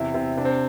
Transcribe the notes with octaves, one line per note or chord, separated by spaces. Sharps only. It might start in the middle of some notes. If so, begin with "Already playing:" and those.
Already playing: E2 C3 E4
C3
C3 D4
C4